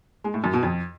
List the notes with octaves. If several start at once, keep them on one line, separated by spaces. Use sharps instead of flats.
G#3
A2
F#2
B2
F2